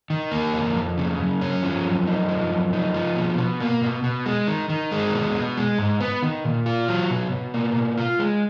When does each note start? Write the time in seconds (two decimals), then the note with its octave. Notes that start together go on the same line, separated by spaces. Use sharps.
0.10 D#3
0.32 A#3
0.54 F2
0.75 F2
0.98 C#3
1.20 F#2
1.41 C#4
1.63 F3
1.85 F#2
2.07 D#4
2.29 F3
2.50 F#2
2.73 D#4
2.94 F3
3.17 B2
3.38 B2
3.60 A#3
3.82 B2
4.04 B2
4.26 G#3
4.47 D#3
4.69 D#3
4.91 G#3
5.13 B2
5.35 B2
5.57 G#3
5.79 G#2
6.01 B3
6.23 D#3
6.44 A#2
6.66 F4
6.88 F#3
7.11 B2
7.32 B2
7.54 A#3
7.76 B2
7.97 F4
8.19 G#3